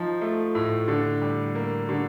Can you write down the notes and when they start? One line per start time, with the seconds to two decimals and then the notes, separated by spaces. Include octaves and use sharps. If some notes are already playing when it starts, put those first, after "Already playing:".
Already playing: F3 D#4
0.21 A3
0.55 A2
0.88 D3
1.22 G3
1.55 A#3
1.89 D3